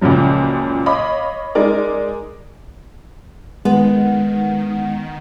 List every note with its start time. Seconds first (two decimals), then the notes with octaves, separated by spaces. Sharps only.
0.01 C#2 A#2 C#3 F3 F#3
0.86 C#5 D#5 F5 B5 D6
1.55 G#3 D#4 A#4 D5
3.65 D#3 G#3 B3 F#5